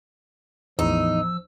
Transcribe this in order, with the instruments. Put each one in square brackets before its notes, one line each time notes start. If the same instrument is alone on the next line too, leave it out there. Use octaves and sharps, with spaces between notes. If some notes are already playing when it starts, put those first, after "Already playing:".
[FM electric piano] A1 E2 [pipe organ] F3 E6 [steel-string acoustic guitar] D#4